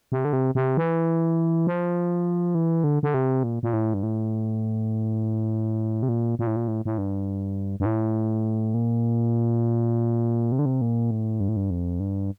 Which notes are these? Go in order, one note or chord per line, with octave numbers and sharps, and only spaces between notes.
C3
D3
C3
C3
E3
F3
E3
D3
D3
C3
A#2
A#2
A2
G2
A2
C3
A#2
A#2
A2
A#2
A2
A2
G2
G2
A2
A#2
C3
D3
C3
A#2
A2
G2
A2
G2
F2
G2